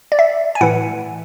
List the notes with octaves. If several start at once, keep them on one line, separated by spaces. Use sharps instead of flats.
D5
E5
G#5
A2 E3 F#5